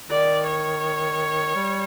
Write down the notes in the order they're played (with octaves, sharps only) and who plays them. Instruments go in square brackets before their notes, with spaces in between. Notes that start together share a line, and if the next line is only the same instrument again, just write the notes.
[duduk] D#3 [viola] D5
[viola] C#5
[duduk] G3